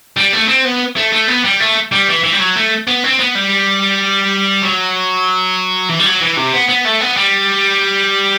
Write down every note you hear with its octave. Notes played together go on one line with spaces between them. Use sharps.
G3
A3
C4
B3
A3
A3
B3
G3
A3
G3
E3
E3
G3
F#3
A3
B3
C4
B3
G3
F#3
E3
G3
F#3
E3
C3
B3
B3
A3
B3
G3